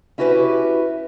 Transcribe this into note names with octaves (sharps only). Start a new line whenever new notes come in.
C#4 E4 F#4 G4 B4